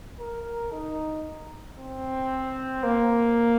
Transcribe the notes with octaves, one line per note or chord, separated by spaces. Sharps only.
A#4
D#4
C4
A#3